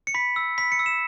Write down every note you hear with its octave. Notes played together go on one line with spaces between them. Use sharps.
C#7
B5 B6
E6
B5 B6
C#7
E6
E7